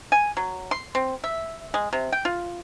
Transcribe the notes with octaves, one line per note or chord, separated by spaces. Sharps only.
G#5
F#3
C6
C4
E5
G#3
C3
G5
F4